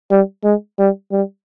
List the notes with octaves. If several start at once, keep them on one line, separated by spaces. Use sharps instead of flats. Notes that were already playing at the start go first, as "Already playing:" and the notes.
G3
G#3
G3
G3